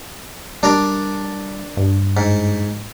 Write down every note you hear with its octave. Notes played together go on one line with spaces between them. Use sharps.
G3 D4 A#4 D5
G2
G#2